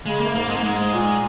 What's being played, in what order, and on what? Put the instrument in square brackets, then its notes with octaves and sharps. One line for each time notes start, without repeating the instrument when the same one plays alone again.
[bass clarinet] C#3 [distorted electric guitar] G#3
[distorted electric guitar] A#3
[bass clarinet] F#2
[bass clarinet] G#2 [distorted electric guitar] A#3
[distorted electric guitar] G#3
A#3
[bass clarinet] G#2 [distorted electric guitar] G#3
[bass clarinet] A#2